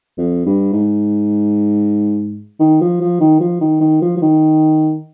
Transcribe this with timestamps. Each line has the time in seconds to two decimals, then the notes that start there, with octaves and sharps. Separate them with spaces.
0.18 F2
0.46 G2
0.73 G#2
2.60 D#3
2.81 F3
3.01 F3
3.21 D#3
3.40 F3
3.61 D#3
3.81 D#3
4.02 F3
4.17 F3
4.22 D#3